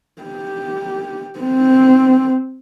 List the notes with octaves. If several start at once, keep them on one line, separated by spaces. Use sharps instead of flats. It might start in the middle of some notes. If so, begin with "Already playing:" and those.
G4
C4